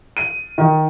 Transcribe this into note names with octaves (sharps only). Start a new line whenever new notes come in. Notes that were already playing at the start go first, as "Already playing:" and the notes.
D#7
D#3